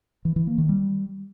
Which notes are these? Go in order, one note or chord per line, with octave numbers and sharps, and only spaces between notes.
E3
E3
A#3
D#3
G3